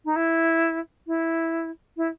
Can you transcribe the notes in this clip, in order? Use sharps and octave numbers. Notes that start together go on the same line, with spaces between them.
D#4
E4
E4
E4